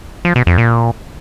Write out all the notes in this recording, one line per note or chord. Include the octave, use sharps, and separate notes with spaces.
F3
B2
F2
A#2